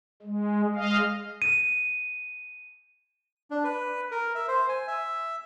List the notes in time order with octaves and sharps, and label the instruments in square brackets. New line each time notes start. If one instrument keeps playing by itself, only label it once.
[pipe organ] G#3
G#3 D#5 F5
[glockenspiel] D#7
[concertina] D4
B4
A#4
E5
C5
G#5
E5